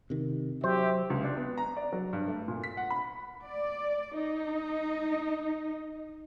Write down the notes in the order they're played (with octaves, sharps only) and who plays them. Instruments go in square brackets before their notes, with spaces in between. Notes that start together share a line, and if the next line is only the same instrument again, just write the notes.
[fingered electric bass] C3 D#3
[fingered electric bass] F#3 [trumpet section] G4 E5 [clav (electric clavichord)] C5
[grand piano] C#2
D4
B3
A#5
D5
F#3
G2
A3
A#2
B6
F#5
B5
[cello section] D5
D#4